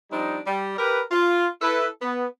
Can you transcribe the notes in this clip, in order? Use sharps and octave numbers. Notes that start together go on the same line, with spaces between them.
F3 G3 C4 D4 D#4
G3
G4 A#4 B4
F4
E4 A4 B4
B3